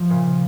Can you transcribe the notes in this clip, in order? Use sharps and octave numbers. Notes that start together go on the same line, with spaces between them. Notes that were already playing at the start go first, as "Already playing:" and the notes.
Already playing: F3
A#2 C#3